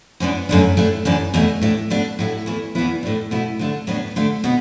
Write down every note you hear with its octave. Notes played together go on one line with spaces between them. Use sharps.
F#2 E3 B3 D4
F#2 D3 A3 D4
A2 A3 D4
F#2 E3 D4
E2 B2 A3
A2 A3 D4
B2 A3 D4
A2 F#3 A3 E4
E2 E3 A3 E4
E2 E3 B3 E4
A2 A3 D4
B2 A3 E4
D3 A3 D4
A2 F#3 B3 D4
D3 A3 D4
B2 B3